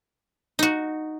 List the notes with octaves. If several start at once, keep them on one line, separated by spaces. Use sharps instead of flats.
D#4 F#4